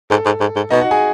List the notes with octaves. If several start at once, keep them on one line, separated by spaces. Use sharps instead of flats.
G#2 A4
G#2
G#2
G#2
B2 D#4 D#5
F#4 F#5
G#4 G#5